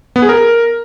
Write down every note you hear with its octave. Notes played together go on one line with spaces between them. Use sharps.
B3
G#4
A#4